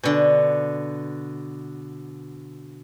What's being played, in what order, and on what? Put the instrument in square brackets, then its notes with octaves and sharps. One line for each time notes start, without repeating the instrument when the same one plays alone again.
[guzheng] B2 D3